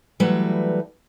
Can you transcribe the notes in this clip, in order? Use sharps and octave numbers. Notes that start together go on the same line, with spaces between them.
E3 F#3 G3 A3 B4